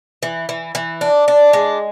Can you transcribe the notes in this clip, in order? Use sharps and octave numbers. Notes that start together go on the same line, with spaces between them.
E3
E3
E3
D4
D4
G#3